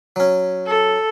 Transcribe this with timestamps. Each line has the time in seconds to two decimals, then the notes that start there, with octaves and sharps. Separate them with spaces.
0.16 F#3 C#4
0.67 A4